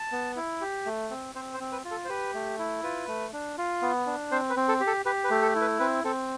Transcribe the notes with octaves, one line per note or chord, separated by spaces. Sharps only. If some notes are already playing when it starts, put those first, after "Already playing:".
Already playing: A5
B3
E4
G4
A3
C4
C4 C5
C5
C4
B4
F4
A4
C5
G4 B4
A3
E4
F4 B4
A3
D4
F4
B3
D4
C4 C5
B4
C4
A4
G4
A4
G4 B4
B4
A3
A4
E4
B4
C4 B4
C4 A4